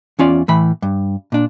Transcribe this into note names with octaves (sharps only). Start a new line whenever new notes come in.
E2 C#4 F4 D5
A2 E3 B5
G2
A#2 D4